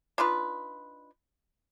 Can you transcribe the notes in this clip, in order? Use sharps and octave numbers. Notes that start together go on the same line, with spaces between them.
D4 D#4 F4 B4